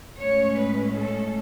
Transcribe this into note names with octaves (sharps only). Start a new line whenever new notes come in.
A2 G#3 C#4 C#5
B4
A4